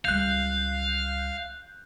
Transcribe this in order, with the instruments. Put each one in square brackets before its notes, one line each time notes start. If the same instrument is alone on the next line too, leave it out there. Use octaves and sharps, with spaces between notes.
[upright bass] C#2 G3 [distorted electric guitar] F5 [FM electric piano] F#6 G6